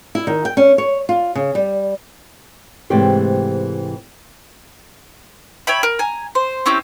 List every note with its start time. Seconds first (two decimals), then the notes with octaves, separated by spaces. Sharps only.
0.15 E4
0.27 D#3
0.45 G5
0.57 C#4
0.78 C#5
1.09 F4
1.35 C#3
1.55 G3
2.90 G#2 C3 E3 A3 G4 C5
5.67 C#5 E5 G5 B5
5.83 A#4
5.99 G#5 A#5
6.35 C5
6.66 C4 C#4 E4 G4